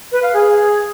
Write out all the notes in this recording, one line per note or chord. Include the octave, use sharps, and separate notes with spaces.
B4
F5
G#4